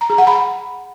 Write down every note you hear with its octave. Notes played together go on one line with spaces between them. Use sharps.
A#5
G#4
F#5
B5